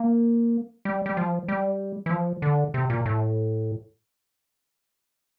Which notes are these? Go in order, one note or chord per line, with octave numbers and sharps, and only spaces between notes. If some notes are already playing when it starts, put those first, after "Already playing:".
Already playing: A#3
G3
G3
F3
G3
E3
F3
D3
C3
A#2
A2